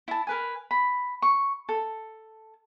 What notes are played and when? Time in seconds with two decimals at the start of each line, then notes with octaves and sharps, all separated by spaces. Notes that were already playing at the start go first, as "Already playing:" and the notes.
0.08 E4 A5
0.27 A#4 B4 G#5
0.71 B5
1.22 C#6
1.69 A4